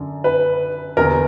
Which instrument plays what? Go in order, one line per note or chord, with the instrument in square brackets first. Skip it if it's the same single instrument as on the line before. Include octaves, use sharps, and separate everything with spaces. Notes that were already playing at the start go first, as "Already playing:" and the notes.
Already playing: [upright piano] F#2 D3
B4
E2 D3 A#4